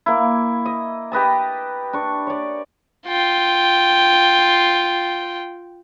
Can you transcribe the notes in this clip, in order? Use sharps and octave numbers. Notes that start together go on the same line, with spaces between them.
A#3 E4
D#5
G4 B4 D#5 A5
D4 C#6
C#5 D5
F4 G5